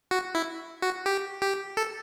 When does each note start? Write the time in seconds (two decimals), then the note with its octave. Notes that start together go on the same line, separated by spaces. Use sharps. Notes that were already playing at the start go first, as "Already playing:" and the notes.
0.11 F#4
0.35 E4
0.82 F#4
1.06 G4
1.42 G4
1.77 A4